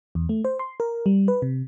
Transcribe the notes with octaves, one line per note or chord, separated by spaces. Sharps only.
E2
A3
C5
C6
A#4
G3
B4
C3